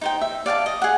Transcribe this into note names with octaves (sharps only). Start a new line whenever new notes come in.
D#4 C5 G5
E5
D5 F5 G5 A5
D#5
G#4 F#5